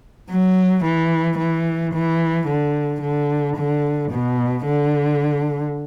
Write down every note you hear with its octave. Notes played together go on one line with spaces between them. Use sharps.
F#3
E3
E3
E3
D3
D3
D3
B2
D3